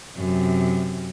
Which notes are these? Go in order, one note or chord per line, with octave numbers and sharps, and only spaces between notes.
F#2 C3